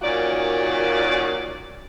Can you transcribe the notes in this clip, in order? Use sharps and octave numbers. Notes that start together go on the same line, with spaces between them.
A#2 D#3 A#3 C#4 F#4 D5